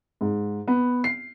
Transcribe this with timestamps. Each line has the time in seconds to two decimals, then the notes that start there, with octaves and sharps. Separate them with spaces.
0.21 G#2
0.68 B3
1.04 C7